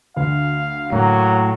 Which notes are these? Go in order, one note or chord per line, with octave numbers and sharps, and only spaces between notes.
D2 D3 F5
A2 F#3 A#3